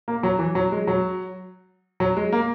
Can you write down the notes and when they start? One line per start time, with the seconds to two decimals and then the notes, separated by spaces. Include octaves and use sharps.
0.08 A#3
0.23 F#3
0.39 E3
0.55 F#3
0.72 G#3
0.87 F#3
2.00 F#3
2.17 G#3
2.32 A#3